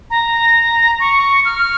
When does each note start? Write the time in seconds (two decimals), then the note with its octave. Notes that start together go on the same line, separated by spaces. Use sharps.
0.10 A#5
1.00 C#6
1.45 F6